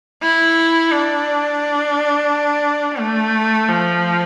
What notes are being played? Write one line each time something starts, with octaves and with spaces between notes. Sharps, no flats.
E4
D4
A3
F3